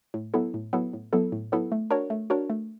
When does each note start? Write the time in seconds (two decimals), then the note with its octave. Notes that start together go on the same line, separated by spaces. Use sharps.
0.14 A2
0.34 F#3 B3 E4 A4
0.54 A2
0.73 F#3 B3 E4 A4
0.93 A2
1.13 F#3 B3 E4 A4
1.32 A2
1.52 F#3 B3 E4 A4
1.72 A3
1.90 D4 F#4 A#4 C#5
2.10 A3
2.30 D4 F#4 A#4 C#5
2.50 A3